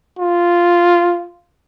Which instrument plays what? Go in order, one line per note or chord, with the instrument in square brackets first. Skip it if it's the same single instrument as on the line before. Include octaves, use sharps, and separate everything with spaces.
[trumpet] F4